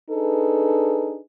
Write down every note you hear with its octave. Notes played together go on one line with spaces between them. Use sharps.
D4 D#4 G#4 A4 B4